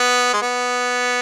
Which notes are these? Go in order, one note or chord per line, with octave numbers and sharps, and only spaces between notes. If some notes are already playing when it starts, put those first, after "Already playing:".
Already playing: B3
G#3
B3